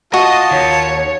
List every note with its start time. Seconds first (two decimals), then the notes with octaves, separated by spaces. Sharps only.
0.14 F4 F#4 D#5 A5
0.51 D#2 C#5